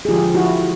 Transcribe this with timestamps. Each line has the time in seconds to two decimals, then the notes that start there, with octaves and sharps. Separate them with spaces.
0.05 G#4
0.09 D3 F3 G#3 F4 G4
0.34 E4 F#4